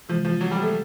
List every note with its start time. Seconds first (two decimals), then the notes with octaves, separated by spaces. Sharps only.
0.09 C3 E3 F3 G#3
0.25 F3
0.41 F#3
0.51 G3
0.62 A3